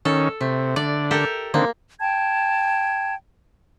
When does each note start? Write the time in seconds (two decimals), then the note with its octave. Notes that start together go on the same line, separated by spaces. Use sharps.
0.05 D#3 C#4 A4
0.41 C3 A3
0.76 D3 D5
1.11 G4 A4 A#4
1.54 D3 D#3 A#3 C4
1.99 G5 A5 G#6